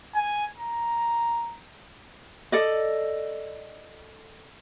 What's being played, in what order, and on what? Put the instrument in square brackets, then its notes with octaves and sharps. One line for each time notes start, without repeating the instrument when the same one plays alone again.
[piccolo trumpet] G#5
A#5
[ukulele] A4 D5 D#5